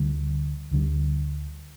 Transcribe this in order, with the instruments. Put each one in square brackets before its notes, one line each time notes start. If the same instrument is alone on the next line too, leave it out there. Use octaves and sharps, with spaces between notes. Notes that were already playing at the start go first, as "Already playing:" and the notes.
Already playing: [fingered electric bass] D2 D3 G3
D2 D3 G3